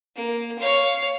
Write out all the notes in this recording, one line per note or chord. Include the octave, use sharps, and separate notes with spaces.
A#3
C#5 F5